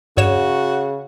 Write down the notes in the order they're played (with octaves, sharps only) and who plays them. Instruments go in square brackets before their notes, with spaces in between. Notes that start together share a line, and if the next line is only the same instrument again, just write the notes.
[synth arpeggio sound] G2 C#5 E7 [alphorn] C#3 [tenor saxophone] F#4